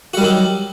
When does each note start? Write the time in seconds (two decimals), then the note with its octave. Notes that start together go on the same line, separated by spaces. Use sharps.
0.14 F#4
0.17 G3
0.21 D#3
0.24 F#3